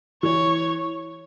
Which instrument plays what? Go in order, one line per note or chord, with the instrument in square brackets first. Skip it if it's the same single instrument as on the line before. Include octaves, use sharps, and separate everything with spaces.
[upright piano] E3 [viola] C#5